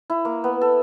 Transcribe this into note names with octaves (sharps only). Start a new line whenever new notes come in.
E4
A#3
B3
A4